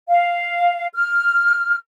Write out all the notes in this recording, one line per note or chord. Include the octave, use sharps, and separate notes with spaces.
F5
F6